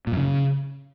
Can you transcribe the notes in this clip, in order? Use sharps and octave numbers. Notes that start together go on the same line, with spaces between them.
A#2
F#2
C#3